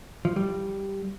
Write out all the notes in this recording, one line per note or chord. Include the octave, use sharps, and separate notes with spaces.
F3
G3